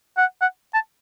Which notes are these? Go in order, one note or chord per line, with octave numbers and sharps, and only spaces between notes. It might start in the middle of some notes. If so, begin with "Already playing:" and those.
F#5
F#5
A5